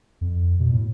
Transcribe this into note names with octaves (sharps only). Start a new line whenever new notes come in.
F2
B2
A2